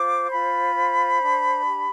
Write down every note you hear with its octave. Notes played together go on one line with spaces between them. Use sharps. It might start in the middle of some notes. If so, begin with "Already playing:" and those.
Already playing: F4 C5 D6
F4 B5
C5
D4
G4